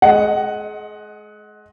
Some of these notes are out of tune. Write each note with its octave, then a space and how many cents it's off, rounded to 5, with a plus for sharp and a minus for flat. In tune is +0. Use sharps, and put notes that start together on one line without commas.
G#3 +35 D#5 +0 F#5 +0